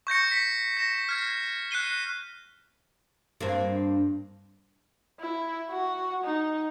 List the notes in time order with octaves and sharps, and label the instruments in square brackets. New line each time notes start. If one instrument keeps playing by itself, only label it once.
[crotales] C#6 G6 A#6 C#7
B6 C#7
A#6 E7
F6 G#6 C7
F#6 C7 D#7 G7
[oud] G2 A#3 C4
[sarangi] E4
F#4
D#4